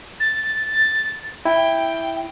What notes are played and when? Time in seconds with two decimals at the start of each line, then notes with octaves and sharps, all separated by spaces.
0.20 A6
1.45 E4 G5